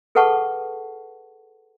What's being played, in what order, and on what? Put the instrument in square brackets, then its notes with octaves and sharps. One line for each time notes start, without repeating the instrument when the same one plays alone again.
[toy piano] G#4 A4 B4 F#5 A5 C#6